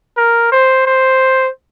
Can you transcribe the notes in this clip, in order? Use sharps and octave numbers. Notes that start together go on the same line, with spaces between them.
A#4
C5
C5